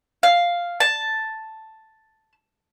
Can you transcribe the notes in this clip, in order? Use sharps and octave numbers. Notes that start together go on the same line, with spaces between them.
F5
A5